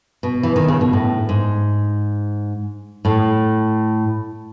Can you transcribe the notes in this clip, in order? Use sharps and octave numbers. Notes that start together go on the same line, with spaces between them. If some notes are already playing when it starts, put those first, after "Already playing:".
B2
E3
D#3
C#3
B2
A2
G#2
A2